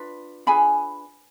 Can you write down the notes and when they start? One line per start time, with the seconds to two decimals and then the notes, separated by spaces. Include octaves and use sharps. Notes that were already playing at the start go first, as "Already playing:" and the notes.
Already playing: D4 F4 B4
0.47 D4 F4 G#4 B4 G#5 B5